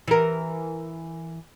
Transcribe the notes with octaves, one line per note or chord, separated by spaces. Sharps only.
E3 A#4